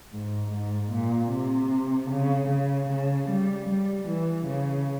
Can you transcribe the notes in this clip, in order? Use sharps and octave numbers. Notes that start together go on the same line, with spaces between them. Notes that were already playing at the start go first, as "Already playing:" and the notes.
G#2
G#2
A#2
C3
C#3
C#3
C#3
G3
G3
E3
C#3